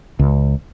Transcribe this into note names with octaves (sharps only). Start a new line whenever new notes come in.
C#2